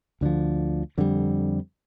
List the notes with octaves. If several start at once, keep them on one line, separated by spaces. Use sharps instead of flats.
D2 D3 F3
F2 D3 G3